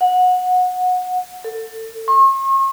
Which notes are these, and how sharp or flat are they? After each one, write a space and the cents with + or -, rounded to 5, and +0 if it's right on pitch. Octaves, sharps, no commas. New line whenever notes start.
F#5 -20
A4 +25
C#6 -45